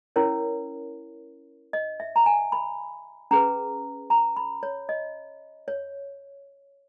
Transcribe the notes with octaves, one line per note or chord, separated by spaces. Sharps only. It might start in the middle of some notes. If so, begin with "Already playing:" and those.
C#4 E4 A#4 C#5
D#5
E5
A#5
G#5
B5
C#4 G#4 B4 A#5
A#5
B5
C#5
D#5
C#5